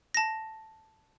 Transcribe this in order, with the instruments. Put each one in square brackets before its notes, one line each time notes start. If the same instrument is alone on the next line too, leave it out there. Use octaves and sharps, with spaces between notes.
[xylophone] A5 A#6